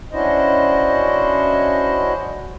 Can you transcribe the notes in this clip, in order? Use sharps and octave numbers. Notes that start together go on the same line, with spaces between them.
C#4 D4 E4 F#4 C5 D#5